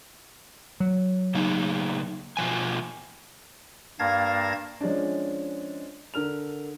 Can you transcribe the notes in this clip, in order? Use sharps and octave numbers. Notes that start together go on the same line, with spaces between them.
F#3
C#3 A#3 D#4
B2 F3 G#5
G2 A#3 F5 A5 G#6 A#6
F3 G#3 C#4 D4
D3 A#4 F6 F7